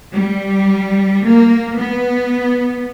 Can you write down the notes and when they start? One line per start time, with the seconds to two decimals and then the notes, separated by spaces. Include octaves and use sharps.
0.15 G3
1.24 A#3
1.80 B3